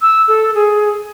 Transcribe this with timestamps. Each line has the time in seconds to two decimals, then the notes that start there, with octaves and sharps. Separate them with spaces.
0.02 E6
0.28 A4
0.55 G#4